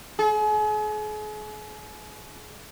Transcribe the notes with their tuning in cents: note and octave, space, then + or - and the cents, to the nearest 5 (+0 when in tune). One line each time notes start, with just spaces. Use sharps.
G#4 +40